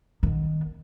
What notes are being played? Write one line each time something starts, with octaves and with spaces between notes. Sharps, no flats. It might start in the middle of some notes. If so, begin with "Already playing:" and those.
D#3 B3